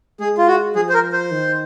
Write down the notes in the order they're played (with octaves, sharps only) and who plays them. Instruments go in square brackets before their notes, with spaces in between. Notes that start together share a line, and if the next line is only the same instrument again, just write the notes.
[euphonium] G#3 [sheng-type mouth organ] G#4
[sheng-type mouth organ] F4
F#4
[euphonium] F3 [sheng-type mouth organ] G#4
[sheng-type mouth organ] C5
A#4
C5
[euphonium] D#3